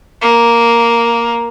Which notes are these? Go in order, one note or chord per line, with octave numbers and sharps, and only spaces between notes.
A#3